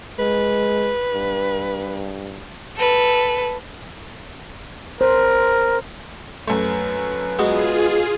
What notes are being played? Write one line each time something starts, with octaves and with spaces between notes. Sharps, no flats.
G#3 B4
G2
A4 B4
A#4 C5
F#2 A3 B4
G#3 B3 F4 F#4 G#4